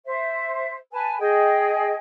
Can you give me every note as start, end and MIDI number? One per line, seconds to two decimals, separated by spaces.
0.05 0.76 72
0.05 0.76 76
0.91 1.17 71
0.91 1.17 80
0.91 1.17 81
1.19 1.95 68
1.19 1.95 75
1.19 1.95 79